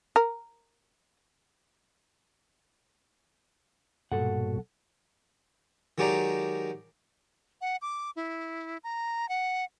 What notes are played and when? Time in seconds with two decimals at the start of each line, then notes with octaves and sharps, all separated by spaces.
0.16 A#4
4.12 B1 G2 A#2 F#3 A4 F#5
5.98 D#3 F#3 G#3 G4 D5 A#5
7.61 F#5
7.82 D6
8.16 E4
8.84 A#5
9.29 F#5